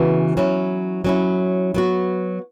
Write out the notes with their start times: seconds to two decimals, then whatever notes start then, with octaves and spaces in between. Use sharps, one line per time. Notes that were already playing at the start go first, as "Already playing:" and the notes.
Already playing: C#3 E3 B3 F#4
0.37 F#3 C#4 E4
1.04 F#3 C#4 E4
1.74 F#3 B3 F#4